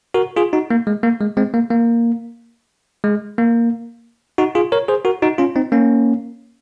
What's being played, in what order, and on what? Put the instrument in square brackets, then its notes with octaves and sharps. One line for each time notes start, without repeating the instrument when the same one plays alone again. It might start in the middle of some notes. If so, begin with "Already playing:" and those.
[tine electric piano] F#4 A#4
F4 G#4
D#4 F#4
A#3
G#3
A#3
G#3
G#3 C4
A#3
A#3
G#3
A#3
D#4 F#4
F4 G#4
A#4 C#5
G#4 C5
F#4 A#4
D#4 F#4
C#4 F4
C4 D#4
A#3 C#4